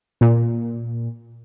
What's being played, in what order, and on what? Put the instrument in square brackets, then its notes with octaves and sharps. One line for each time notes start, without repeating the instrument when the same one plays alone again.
[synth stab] A#2